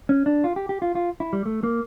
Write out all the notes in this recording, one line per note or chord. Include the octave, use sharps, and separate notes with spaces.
C#4
D4
F4
G4
G4
F4
F4
E4
G3
A3
A#3